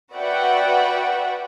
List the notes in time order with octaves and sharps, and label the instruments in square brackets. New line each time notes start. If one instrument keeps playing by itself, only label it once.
[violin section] F#4 B4 D5 E5 F#5 G5